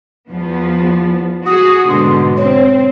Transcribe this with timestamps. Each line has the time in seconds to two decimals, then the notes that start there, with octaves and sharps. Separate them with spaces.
0.29 E2 F3 B3
1.46 F#4 G#4 D#6
1.89 G#2 B2 D3 C6
2.37 C4 C#5